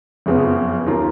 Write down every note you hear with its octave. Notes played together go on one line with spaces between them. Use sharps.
F#1 F2 C#3 F3 B3
D#2 D#3 A#3 F4 A#4